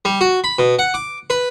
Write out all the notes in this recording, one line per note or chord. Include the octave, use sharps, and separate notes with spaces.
G3
F#4
B5
B2
F#5
D6
B4